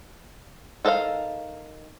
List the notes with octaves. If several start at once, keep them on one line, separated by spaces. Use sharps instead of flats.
D#4 A4 A#4 D#5 F5